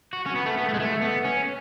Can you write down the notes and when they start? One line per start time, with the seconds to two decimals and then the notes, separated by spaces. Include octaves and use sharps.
0.13 F#4
0.26 C#4
0.35 B3
0.46 A3
0.57 B3
0.69 A3
0.74 G#3
0.80 A3
1.01 B3
1.25 C#4